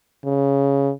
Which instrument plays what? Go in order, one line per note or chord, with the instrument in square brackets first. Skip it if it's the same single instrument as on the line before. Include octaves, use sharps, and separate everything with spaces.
[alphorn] C#3